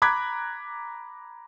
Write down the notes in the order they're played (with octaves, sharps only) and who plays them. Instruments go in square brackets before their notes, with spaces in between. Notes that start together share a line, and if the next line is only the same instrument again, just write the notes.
[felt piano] A#5 B5 D6 F#6 G#6 B6